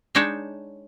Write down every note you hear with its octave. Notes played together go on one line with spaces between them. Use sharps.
G#3 D4 D#4 C#5 G5 A5